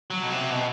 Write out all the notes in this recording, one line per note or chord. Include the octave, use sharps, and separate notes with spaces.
F#3
B2
C3
B2